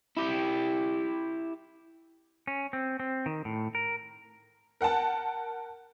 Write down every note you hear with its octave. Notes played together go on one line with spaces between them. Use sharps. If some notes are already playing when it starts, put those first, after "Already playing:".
E4 G4
C#4
C4
C4
D#3
A2
A#4
A#4 F#5 G5 A5